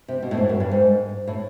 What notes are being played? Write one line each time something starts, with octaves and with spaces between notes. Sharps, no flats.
C3
B2
A2
G#2
F#2
G2
G#2
A2